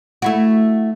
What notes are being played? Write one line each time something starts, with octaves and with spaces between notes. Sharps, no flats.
A3 E4 F#4